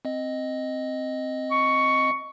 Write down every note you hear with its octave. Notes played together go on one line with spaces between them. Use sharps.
C4 D#5
C#6